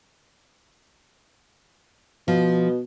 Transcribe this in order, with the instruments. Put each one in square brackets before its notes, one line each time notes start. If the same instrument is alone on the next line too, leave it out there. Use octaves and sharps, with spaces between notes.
[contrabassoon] B2 [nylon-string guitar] F3